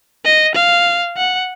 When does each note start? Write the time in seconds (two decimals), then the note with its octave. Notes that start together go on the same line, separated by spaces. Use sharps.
0.25 D#5
0.55 F5
1.17 F#5